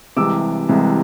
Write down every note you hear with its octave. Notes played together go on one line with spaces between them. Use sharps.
C2 C3 E3 G#3 D6 E6
C2 C3 E3 G#3